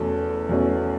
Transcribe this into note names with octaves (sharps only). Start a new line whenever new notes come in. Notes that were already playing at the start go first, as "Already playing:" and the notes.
Already playing: E2 B2 A3 C#4 A4
E2 B2 A3 C#4